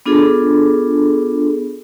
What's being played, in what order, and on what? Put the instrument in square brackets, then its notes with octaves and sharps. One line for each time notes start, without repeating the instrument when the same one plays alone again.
[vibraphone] B3 D4 F4 G#4 A4